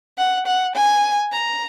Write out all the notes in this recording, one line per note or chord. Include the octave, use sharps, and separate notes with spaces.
F#5
F#5
G#5
A#5